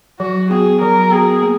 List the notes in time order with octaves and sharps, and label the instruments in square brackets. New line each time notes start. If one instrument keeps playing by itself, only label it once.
[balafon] F#3 [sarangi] F#4
[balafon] B3 F#4 [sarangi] G#4
[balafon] F#3 [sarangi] A#4
[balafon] B3 F#4 [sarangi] G#4
[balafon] A#3